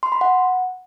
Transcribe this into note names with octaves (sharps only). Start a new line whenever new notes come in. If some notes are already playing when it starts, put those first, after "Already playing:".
C6
B5
F#5